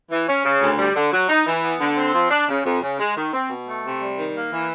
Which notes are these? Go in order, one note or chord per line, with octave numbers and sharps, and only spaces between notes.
E3
C#4
C#3
D2
G3
D3
F#3
D#4
E3
B3
D3
C4
F3
D4
C#3
F2
C#3
G#3
D#3
C4
B2
A3
C3
G3
D#3
A#3
E3